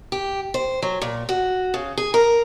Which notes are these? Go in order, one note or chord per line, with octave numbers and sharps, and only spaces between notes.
G4
C5
F#3
A#2
F#4
C#3
G#4
A#4